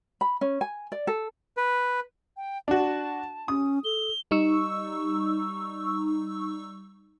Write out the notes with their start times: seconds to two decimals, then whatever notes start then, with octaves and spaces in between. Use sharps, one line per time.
0.21 B5
0.41 C#4
0.61 G#5
0.92 D5
1.07 A4
1.57 B4
2.37 G5
2.68 D4 F#4 A5
3.48 C#4 D#6
3.84 A4 G7
4.31 G3 D#4 C#6 E6